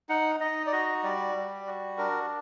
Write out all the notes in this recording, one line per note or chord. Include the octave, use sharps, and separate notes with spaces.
D#4 F#5
D#4 D#5
D5
F#4 D#5
G3 D5
G3
F#4
D4 A#4